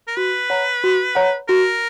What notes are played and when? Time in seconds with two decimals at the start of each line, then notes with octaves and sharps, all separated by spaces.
0.07 A#4
0.17 F#4 B4
0.50 C#5 F#5 A#5
0.84 F#4
1.15 C#5 F#5 A#5
1.49 F#4 A#4